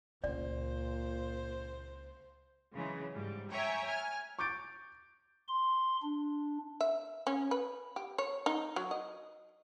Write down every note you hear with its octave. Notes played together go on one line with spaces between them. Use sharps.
C#2 A#2 C#4 C5 D5
C#3 E3 F#3 G#3
G#2 G3
C#5 E5 G5 G#5 A#5 C#6
G#5 F6
C#6 D6 G6 A6 D7
C6
D4
E5
C#4
B4
G4
C#5
D#4
F#3
D#5